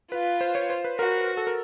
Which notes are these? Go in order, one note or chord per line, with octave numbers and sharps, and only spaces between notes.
F4 B4
C5
C#5
C5
B4
F#4 A#4
A4
A#4